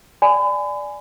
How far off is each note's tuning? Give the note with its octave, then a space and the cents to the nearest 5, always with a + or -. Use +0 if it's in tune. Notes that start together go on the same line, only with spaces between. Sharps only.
D5 +0 G#5 +0 B5 +35